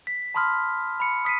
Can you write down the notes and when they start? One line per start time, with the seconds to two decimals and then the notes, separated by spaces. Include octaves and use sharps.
0.07 B6
0.35 A5 B5 C6 D#6 F6
1.00 B5 C#7
1.25 D#6 B6 C7 D#7